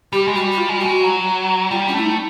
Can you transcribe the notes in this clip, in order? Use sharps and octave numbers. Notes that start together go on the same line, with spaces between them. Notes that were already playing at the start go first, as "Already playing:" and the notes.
G3 G4
G#3
G3 F#4
F#4
F4
G#3
G3
G#3 F#4
F#3
G3 F4
C#4
A3 E4
D#4